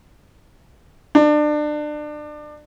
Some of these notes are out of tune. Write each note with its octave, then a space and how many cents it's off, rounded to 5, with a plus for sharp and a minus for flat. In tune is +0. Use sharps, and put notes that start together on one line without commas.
D4 +30